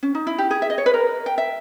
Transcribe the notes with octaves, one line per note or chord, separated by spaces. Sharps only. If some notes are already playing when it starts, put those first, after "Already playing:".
C#4
D#4
E4
G4
G#4
E5
D#5
C#5
B4
A#4
G5
E5